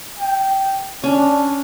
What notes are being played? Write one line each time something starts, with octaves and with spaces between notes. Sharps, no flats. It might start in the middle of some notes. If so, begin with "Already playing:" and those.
G5
C#4 D4